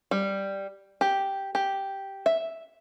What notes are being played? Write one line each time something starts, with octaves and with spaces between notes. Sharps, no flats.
G3
G4
G4
E5